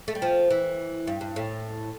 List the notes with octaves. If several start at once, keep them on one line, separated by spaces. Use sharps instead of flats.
A3
G3
F3
E3
G2
G2
A2